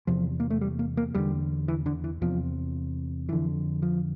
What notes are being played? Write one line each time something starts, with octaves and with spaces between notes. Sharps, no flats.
E2 C3 F3
A#3
A3
G3
A#3
A#3
E2 D3 G3
E3
D3
E3
E2 C3 F3
F2 D3 E3
F3